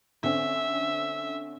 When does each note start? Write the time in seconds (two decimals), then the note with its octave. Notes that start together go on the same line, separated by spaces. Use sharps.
0.23 D3 C4 C#4 E5